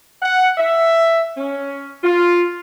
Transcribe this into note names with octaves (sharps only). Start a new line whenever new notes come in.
F#5
E5
C#4
F4